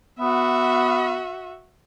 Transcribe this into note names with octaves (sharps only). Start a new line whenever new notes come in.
B3 F#4 E5